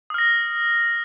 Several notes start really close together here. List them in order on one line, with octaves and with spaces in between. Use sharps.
D#6 F6 A#6